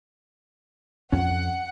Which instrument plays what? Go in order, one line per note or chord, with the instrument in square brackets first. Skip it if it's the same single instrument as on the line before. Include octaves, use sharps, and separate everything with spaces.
[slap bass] F2 C#4 [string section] F#5